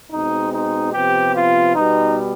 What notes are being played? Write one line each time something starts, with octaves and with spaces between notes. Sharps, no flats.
B2 G#3 C4 D#4
D#4
C3 F3 B3 G4
F4
B2 G3 B3 D#4